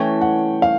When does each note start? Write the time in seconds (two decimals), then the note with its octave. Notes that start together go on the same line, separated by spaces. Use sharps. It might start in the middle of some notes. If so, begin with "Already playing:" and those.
Already playing: E3 A3 C#4 G5
0.21 F#5
0.62 F5